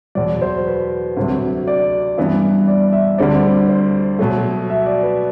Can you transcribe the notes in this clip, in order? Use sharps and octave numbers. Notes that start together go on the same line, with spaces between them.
E2 B2 F#3 D5
C5
B4
D2 C3 F#3
D5
G2 E3 B3 E4
D5
E5
D2 D3 G3 C4 D5
C5
B2 F#3 A3
E5
D5
B4